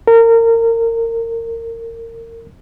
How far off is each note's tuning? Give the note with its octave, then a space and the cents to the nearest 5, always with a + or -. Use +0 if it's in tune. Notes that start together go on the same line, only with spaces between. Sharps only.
A#4 -25